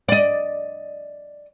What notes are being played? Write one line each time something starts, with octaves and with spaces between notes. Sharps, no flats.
D5 D#5